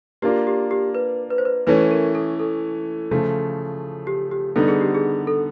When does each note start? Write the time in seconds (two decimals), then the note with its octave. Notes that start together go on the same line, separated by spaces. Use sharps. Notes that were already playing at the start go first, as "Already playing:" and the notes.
0.22 A#3 D4 F4 G4 A#4
0.47 G4
0.71 G4
0.95 B4
1.31 B4
1.38 C5
1.45 B4
1.67 E3 A3 C#4 B4
1.91 A#4
2.15 A4
2.39 A4
3.11 C#3 F3 A3
4.07 G4
4.31 G4
4.56 D3 G3 B3 D#4 A4
4.68 G#4
4.81 G4
4.95 G#4
5.27 A4